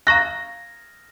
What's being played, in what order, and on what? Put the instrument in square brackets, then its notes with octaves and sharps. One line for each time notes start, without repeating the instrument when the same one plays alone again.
[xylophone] F5 A#5 C#6 F#6 [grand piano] A#6